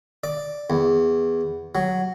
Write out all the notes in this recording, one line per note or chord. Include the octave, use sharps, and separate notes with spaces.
D5
E2
F#3